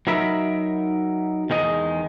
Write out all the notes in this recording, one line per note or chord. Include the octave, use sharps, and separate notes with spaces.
F#3 D#4 A#4 E5 B5
E2 D#3 G#3 D#5